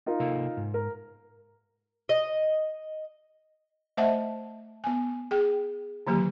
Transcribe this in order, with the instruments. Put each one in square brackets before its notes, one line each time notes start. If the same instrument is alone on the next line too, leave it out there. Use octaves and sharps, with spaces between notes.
[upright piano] D#4 F4 A#4
[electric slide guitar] C3 A#3 A4
G#2
[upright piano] A#4
[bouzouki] D#5
[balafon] A3 C5 D#5 E5 F#5 A5
B3 G#5
G#4 G5
D3 D#3 F#3 A#3 G4